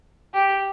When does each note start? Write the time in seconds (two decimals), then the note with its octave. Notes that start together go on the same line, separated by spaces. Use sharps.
0.34 G4